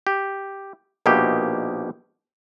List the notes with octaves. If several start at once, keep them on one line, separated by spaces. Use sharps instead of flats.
G4
A#1 B2 A#3 D#4 G4 E5